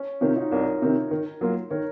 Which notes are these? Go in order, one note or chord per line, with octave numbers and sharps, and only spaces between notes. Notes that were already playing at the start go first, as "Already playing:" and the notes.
Already playing: C#4
C3 D#3 C#4 F4
D#4 F#4
C2 A#4 C#5
C3 D#3
D#3
F#3 A#3 F4
D#3 A#4 C#5